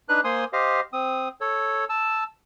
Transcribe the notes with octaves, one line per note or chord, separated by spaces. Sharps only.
D4 D#4 B4 F#6
A#3 C5 G#5 C6 D#6
G4 C5 D#5 F5
C4 D#6
A4 C#5
A5 E6